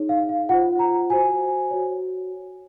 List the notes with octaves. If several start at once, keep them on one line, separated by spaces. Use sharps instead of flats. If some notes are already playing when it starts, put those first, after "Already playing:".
Already playing: D#4 G#4 C#5
F5
F5
F4 C5 F#5
A#5
F#4 C5 G#5
F#4 C#5